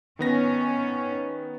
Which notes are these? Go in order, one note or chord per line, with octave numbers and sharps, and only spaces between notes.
D#3 B3 C#4 A#6